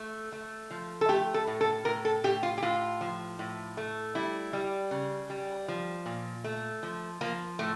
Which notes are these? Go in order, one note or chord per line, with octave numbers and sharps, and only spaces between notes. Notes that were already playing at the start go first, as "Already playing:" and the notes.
Already playing: A3
A3
F3
A4
A3 G4
A4
A2
A4
A2 A#4
A4
A2 G4
F4
G4
A2 F4
F3
A2
A3
G3 E4
G3
C#3
G3
F3
A#2
A3
F3
F3 A#3
A2 A3